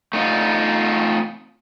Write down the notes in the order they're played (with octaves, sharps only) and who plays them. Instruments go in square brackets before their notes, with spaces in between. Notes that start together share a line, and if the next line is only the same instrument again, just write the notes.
[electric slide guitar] A3 D#4 F4